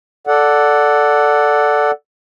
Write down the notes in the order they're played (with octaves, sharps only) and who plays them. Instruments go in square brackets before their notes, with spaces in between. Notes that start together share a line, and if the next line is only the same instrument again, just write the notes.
[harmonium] A4 D5 F#5